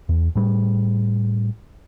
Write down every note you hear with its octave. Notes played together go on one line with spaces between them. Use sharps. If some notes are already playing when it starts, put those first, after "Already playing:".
E2
A2 G3